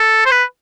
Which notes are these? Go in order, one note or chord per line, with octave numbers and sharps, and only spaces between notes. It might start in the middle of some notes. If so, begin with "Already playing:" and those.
Already playing: A4
C5
B4